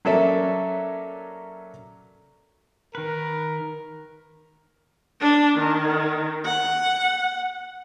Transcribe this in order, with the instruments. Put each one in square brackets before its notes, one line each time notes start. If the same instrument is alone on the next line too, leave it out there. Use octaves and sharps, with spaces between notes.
[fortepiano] F#3 A#3 C#4 A4 D5 E5
[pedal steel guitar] D#3 B4 [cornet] A#4
[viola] D4
D#3
F#5